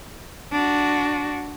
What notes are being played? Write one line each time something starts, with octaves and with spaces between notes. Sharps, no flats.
D4 F#4